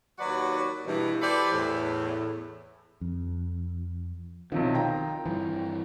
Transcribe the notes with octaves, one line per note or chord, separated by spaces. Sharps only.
D#2 F#3 F#4 B4 D5
G2 B2 E3
E4 G4 A4 B4 C5 D5
E2 A2
F2
B1 C3 D#3 F3
F4 G5 A#5
G2 E3